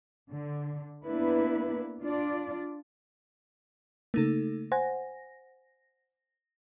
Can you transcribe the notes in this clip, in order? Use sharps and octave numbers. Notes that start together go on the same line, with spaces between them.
D3
A#3 B3 D4 E4 B4
D4 F4 D5
C#3 A3 A#3 D#4 A4
C5 F#5 G#5 A#6